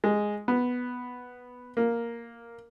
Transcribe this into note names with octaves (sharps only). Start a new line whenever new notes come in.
G#3
B3
A#3